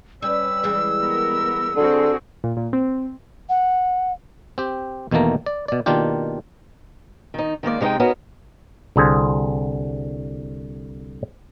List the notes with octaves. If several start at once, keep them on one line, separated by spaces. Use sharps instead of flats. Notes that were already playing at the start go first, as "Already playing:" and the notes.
G3 C#4 B4 E6
E3 G3 G#3
B3 A#4
D3 C4 F#4 G#4
A#2
A#2
C4
F#5
C4 G4
E2 B2 D#3 A3 A#3 A#5
D5
B2 D5
B2 D#3 A#3 D4 F4 G4
D#3 D#4
D#3 G#3 A#3 D5
C3 G#3 D#4 D#5 G5
B3 C#4 D#4 F#4 A#4
C2 D3 G#4 C5